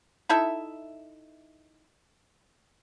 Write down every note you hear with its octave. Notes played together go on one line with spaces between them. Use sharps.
D#4 E4 A4 E5